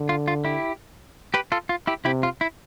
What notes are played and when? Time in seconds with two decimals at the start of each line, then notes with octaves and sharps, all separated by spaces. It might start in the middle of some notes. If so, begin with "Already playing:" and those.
Already playing: D3
0.09 F4
0.28 F4
0.45 E4 G4
1.34 G4 B4
1.52 F4 A4
1.69 F4
1.87 E4 G4
2.05 C3 E4 G4
2.23 F4
2.41 E4